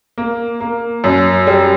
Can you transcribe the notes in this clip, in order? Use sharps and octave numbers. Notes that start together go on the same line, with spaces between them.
A#3
A#3
F#2
G3